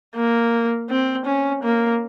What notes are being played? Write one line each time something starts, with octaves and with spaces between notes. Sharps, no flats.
A#3
C4
C#4
A#3